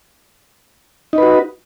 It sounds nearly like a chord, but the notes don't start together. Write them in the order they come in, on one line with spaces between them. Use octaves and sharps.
D#4 B4 F#4